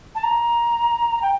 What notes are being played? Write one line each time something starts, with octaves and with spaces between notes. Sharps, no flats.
A5
A#5
G5